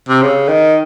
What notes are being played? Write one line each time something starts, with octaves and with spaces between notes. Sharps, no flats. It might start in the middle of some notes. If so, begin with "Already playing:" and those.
C3
C#3
D#3